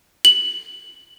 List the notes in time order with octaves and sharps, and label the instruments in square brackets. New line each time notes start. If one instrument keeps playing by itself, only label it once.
[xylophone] F#7